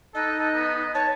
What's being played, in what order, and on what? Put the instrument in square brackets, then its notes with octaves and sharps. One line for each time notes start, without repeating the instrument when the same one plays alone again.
[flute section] D#4 F#6 [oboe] A4 [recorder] D#5
[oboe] A4
B3
[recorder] C#5 [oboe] A5